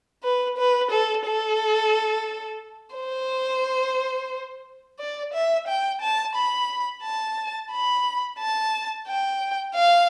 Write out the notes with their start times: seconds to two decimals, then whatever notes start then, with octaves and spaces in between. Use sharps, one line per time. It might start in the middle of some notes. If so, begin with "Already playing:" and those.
0.23 B4
0.58 B4
0.91 A4
1.26 A4
2.96 C5
4.99 D5
5.33 E5
5.67 G5
6.02 A5
6.35 B5
7.03 A5
7.72 B5
8.39 A5
9.08 G5
9.75 F5